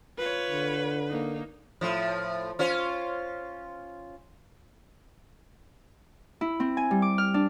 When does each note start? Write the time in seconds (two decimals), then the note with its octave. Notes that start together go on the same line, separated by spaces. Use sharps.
0.18 F4 B4 C#5
0.51 D3
1.08 A#3 D#4
1.81 A2 F3
2.59 C#4 F4 C5
6.41 E4
6.60 C4
6.77 G#5
6.91 G3
7.02 D6
7.18 F6
7.34 D4